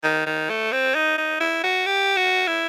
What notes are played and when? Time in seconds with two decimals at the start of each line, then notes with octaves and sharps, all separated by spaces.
0.04 D#3
0.26 D#3
0.50 A3
0.72 C4
0.95 D#4
1.18 D#4
1.41 E4
1.64 F#4
1.86 G4
2.17 F#4
2.47 E4